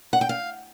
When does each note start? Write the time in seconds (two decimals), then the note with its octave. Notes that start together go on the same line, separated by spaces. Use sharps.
0.13 F#5
0.21 G5
0.29 F5